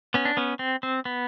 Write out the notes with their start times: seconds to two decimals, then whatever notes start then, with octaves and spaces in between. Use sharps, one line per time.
0.14 B3 C#4
0.25 D4
0.37 B3 C#4
0.59 C4
0.83 C4
1.05 B3